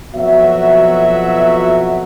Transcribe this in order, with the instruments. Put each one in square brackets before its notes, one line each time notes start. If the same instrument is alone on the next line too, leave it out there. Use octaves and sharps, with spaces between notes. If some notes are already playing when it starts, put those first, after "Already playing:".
[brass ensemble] F2 B2 F3 F#3 F#4 E5